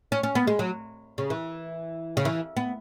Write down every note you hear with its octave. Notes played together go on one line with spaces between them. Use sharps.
C#4
C#4
B3
G#3
F#3
C#3
E3
C#3
E3
B3